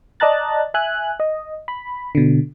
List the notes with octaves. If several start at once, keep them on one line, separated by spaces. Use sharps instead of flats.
D5 D#5 A5 A#5 F#6 A6
E5 G#5 F#6
D#5
B5
B2 D3